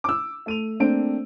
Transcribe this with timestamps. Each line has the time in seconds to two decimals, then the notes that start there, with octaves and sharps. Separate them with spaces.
0.04 D6 E6
0.46 A3 D#7 F7
0.80 A3 A#3 C4 D4 C5 D7